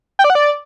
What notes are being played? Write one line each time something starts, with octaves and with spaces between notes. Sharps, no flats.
G5
D5
F#5
D5